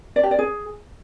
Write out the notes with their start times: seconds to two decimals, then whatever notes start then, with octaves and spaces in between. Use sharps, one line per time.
0.16 D5
0.24 G4
0.31 D5
0.39 G#4